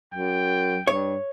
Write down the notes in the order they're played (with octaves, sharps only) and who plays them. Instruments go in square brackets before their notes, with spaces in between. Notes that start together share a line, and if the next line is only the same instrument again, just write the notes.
[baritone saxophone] F#2 [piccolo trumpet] G5
[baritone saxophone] G2 [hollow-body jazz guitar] C#5